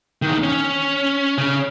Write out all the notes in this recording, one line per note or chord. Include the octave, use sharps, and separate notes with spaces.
E2 D#3
C#4
C#3 C#4